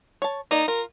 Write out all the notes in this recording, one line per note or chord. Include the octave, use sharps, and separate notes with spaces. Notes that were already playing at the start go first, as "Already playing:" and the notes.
C#5 A5
A#3 D#4 A#4 D5
F4 A#4